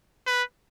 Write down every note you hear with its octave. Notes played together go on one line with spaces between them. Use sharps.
B4